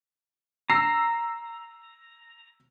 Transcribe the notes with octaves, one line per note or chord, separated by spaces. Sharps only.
A#5 E6 C7